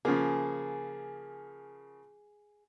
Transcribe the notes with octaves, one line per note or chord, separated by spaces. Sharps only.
C#3 F3 A#3 G#4